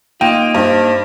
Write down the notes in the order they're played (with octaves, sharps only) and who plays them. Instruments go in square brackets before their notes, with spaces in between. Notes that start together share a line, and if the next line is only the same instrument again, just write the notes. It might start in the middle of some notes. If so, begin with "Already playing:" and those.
[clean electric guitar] A#3 D#4 [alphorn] F4 [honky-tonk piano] G5
[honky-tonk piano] G2 [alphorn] C5